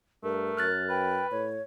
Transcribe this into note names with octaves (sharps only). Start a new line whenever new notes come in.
G2 A3 A#4
F#2 F6 F#6 A6
B4 G5
A2 C#5